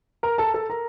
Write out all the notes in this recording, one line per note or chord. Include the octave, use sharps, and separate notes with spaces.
A#4 A#5
A4 A5
A4 A5
A#4 A#5